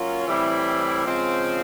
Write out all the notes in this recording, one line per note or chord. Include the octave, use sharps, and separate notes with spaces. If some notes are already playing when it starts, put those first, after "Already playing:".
Already playing: F#3 A#3 C#4 F4
A2 E3 G3 C4 E4
C#3 F3 G#3 C4